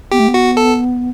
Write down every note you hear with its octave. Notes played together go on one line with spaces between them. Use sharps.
B3 G4
A3
B3
F#4
A4